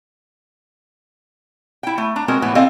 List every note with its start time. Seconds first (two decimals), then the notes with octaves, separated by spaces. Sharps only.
1.83 E4 G5
1.98 A3
2.16 D4 A#5
2.28 G#3 B3 C4 F#4 A#4
2.42 A2 E3 B3
2.55 C4 A4 D#5 F5 G#5